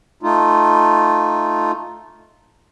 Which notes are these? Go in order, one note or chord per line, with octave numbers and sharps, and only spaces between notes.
A3 D#4 F4